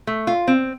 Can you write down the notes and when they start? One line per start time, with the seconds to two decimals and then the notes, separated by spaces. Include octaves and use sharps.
0.07 A3
0.27 F4
0.48 C4